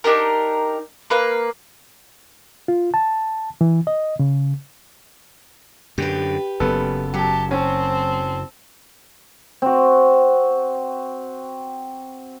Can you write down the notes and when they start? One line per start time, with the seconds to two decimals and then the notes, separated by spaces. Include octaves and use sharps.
0.04 D4 D#4 G4 A#4
1.10 A#3 B4 F5
2.68 F4
2.94 A5
3.61 E3
3.87 D#5
4.19 C#3
5.98 F#2 D3 G4 B4
6.60 F#1 F#2 B3 A4
7.14 F#3 G4 A5
7.51 C4 C#4 A5
9.62 C4 F#4